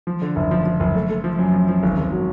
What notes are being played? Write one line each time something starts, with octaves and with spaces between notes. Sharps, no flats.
F3
D3
F#1
F3
F3
F#1
A3
A3
F3
F#2
F3
F3
G#1
G#1
F#3